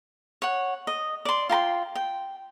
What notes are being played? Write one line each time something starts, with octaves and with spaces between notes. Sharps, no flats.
C#5 F#5
D#5
D5 C6
F4 G5 A#5 C6
G5